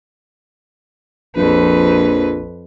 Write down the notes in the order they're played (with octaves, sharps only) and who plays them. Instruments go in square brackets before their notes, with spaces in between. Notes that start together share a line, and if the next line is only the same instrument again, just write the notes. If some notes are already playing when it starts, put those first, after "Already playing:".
[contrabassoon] A#1 [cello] F2 B4